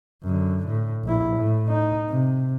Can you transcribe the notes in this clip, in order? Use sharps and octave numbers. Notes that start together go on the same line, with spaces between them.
F#2 D3
A2
A#1 E4
A2
D#4
C3